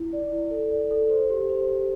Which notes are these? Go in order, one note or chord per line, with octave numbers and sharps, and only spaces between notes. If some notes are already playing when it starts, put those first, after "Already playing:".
Already playing: E4
D5
E4
A4
D5
A4
C5
G4
C5
G4